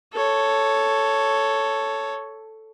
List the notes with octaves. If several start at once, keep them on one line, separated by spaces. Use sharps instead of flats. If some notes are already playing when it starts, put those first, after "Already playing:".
A4 C#5